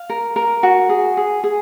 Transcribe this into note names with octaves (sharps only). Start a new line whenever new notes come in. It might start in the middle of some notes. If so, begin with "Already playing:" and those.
Already playing: F5
A#4
A#4
F#4
G#4
G#4
G#4